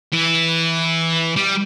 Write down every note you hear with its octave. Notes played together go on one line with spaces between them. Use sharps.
E3 E4
G3